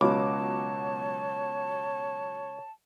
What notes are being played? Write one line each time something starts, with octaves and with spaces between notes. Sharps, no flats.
C#2 B2 F#3 C#5 A5 D6